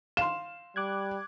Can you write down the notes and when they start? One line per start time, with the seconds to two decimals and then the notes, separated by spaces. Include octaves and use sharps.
0.17 F5 C6 E7
0.76 G3 D6 F#6 G#6